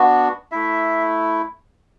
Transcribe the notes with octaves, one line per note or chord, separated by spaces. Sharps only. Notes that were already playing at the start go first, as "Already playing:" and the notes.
Already playing: B3 D4 F#4
A3 E4 E5